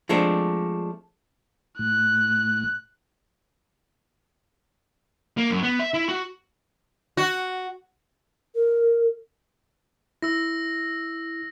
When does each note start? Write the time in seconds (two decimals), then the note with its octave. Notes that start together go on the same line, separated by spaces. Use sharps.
0.09 F3 G#3 A3 C4 D4
1.79 A2 F#6
5.37 A#3
5.51 F#2
5.63 B3
5.79 E5
5.94 E4
6.09 F#4
7.17 F#4
8.54 A#4
10.22 E4 E6 A#6